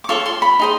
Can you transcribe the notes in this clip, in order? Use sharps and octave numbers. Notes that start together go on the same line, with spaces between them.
D6
F4 A4 C#5 C#6
C6
B5
D#4 G#4 C5